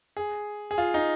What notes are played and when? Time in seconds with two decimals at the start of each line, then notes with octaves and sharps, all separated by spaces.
0.17 G#4
0.71 G#4
0.78 F4
0.94 D#4